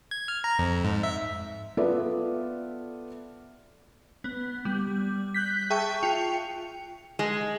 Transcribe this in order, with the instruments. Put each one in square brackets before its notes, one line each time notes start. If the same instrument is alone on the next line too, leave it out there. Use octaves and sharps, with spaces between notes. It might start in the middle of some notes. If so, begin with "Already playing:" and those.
[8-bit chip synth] G#6
F6
A#5
F2
G#2
E5
[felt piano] B3 F4 A4 B4 D5 E5
[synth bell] B3
G3
F#6 G6 B6
G#4 E5 G5 A5 C#6
F4 G5 C#7 F7
[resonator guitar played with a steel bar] G#3